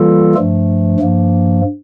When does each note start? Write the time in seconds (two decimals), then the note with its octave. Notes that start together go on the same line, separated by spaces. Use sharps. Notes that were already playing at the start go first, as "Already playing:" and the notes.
Already playing: E3 G3 A#3 F4 A4
0.34 G2 F3 A3
1.00 G2 F3 A#3